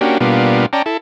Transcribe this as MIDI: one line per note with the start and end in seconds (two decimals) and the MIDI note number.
0.01 0.18 58
0.01 0.18 61
0.01 0.18 62
0.01 0.18 66
0.01 0.18 67
0.21 0.66 47
0.21 0.66 55
0.21 0.66 58
0.21 0.66 59
0.21 0.66 62
0.21 0.66 65
0.73 0.82 61
0.73 0.82 74
0.73 0.82 79
0.73 0.82 81
0.73 0.82 82
0.86 0.97 64
0.86 0.97 69